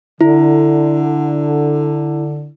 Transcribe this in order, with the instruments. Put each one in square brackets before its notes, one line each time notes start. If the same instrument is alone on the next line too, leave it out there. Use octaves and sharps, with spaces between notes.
[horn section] D3 [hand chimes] E4